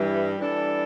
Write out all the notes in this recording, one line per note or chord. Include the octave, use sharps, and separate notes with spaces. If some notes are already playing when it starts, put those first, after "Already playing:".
Already playing: G2 E3 G3
E3 G3 D4 A4